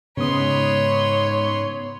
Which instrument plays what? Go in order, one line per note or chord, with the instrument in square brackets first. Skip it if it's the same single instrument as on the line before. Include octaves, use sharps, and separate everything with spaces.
[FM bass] G#2 [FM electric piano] C#3 B3 D#6 [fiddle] B4 C6 [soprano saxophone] C#5